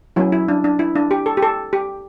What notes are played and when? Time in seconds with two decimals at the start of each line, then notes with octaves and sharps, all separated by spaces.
0.16 F#3 C#4 E4
0.32 E4
0.48 D4
0.64 D4
0.79 E4
0.96 D4
1.11 G4
1.26 A4
1.37 G4
1.43 A4
1.73 G4